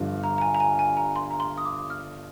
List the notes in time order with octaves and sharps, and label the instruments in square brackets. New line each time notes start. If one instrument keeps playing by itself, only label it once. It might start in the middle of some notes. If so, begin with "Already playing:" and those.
Already playing: [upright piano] G1 G2 F3
[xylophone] A#5
A#5
G#5
A#5
G#5
G#5
A#5
C6
A#5
C6
D#6
D6
F6